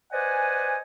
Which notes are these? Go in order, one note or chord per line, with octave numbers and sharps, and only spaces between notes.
B4 C5 D5 D#5 F#5 G#5